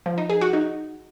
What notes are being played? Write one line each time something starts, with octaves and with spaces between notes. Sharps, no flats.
F3
D#4
G#4
F#4
D#4